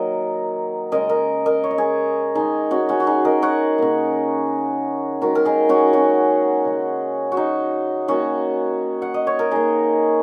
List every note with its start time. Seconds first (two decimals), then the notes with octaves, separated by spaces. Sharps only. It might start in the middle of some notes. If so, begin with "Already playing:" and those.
Already playing: D#3 F#3 A#3 A#4 D#5
0.92 C#3 G#3 A#4 D#5
1.09 A#4 D#5
1.46 A#4 D#5
1.64 C#5
1.71 D#5
1.78 G#4 C#5
2.35 D#3 G#3 D#4 G#4
2.71 C#4 F#4
2.89 C#4 F#4
3.00 F#4
3.07 D#4 G#4
3.25 A#4 D#5
3.42 C#5 F#5
3.78 C#3 A#3
5.22 D#3 G#3 F#4 A#4
5.35 A#4
5.45 D#4 G#4
5.69 C#4 F#4
5.93 C#4 F#4
6.65 C#3 G#3
7.32 F#4
7.37 D#4
8.08 D#3 A#3 C#4 F#4
9.02 F#5
9.14 D#5
9.27 C#5
9.39 A#4
9.51 D#3 A#3 D#4 G#4